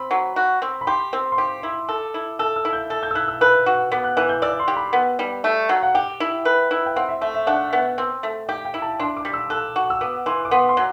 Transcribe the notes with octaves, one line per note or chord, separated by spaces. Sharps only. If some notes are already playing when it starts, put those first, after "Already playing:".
Already playing: C4 B5
F#3
F#4
C4
B5
G4 C6
C4
C6
G4 D6
E4
A4
E4
A4 E6
E6
E4
G6
A4 A6
G6
E6
E4 F#6
E6
B4 E6
F#4
B3 D6
F#6
E3 F#6
G6
D5 E6
C6
G4
B5
B3
G3
A3
F#3
F#5
G4 G5
E4
B4
E4
G5
C4 F#5
E5
A3 E5
E5
D4 F#5
B3
C4
A3
G4 G5
G5
E4
A5
D4 C6
D6
G3
E6
A4 F#6
F#4
E6
B3 D6
E3 C6
D6
B3 C6
C6
F#3